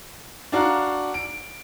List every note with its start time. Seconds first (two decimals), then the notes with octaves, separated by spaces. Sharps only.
0.52 D4 F#4 F5 A#5
1.14 D7